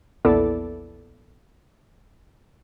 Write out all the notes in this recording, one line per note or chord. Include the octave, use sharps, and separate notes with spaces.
A#1 E2 B3 E4 A4 D5